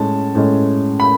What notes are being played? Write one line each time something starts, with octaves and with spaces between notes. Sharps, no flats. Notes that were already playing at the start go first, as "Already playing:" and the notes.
Already playing: A2 G#3 C#4 A5
A2 G#3 C#4
B5